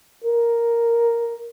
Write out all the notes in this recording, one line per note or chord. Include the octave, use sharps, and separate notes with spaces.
A#4